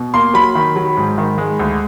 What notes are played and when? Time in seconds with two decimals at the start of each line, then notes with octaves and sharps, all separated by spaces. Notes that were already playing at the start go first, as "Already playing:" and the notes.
Already playing: B2
0.14 A#3 C6
0.34 F#3 B5
0.55 D#3
0.76 F#3
0.97 G#2
1.18 D#3
1.38 G#3
1.59 D2